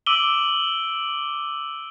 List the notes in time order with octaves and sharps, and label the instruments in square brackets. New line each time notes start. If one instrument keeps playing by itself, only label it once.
[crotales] D6 E6 D7 D#7 F#7 G7